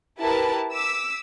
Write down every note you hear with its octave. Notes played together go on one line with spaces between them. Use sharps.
E4 G4 A#4 B4 A5
D6 E6 B6